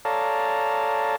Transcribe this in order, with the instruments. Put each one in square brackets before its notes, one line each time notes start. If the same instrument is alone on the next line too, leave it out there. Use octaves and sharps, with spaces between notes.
[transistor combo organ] A4 C#5 D5 F5 A5 A#5